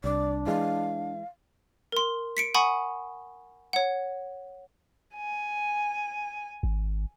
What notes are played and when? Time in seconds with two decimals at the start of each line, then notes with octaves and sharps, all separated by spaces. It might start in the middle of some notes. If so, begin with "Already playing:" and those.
0.04 C2 D4 D5
0.47 E3 G#3 F5
1.92 A#4 C6
2.37 B6 C#7 D7
2.54 F#5 G#5 B5 C#6 D#6
3.73 C#5 F#5
5.16 G#5
6.63 G#1